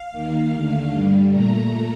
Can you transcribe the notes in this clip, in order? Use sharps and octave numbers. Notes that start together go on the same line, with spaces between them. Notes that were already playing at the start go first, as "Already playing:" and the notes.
Already playing: F5
D#2 D#3 A#3
D#2 D3 A3
G2 D3 G3
A#2 A3 A#5